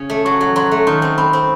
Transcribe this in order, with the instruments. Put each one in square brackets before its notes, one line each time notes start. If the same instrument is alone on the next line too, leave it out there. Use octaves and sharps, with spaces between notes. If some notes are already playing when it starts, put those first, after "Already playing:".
Already playing: [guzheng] C#3 C#4
A3
[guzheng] F#3 [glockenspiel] C#6
[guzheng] F#3
[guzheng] F#3 [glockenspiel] C6
[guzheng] A3
[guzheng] D#3 [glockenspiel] C6
[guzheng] C4
[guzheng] C4 [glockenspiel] B5
[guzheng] C4